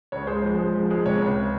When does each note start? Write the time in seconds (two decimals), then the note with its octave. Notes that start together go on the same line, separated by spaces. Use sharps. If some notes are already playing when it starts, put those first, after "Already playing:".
0.12 C#2 C#5
0.27 G#3 C5
0.43 F3
0.58 G#3
0.75 F3
0.90 G#3
1.06 C3 C#5
1.21 C#2